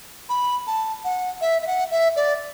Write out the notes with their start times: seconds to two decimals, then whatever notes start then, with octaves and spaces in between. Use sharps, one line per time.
0.29 B5
0.67 A5
1.04 F#5
1.41 E5
1.62 E5
1.67 F#5
1.91 E5
2.16 D5